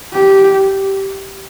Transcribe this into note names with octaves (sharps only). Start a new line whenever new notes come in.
G4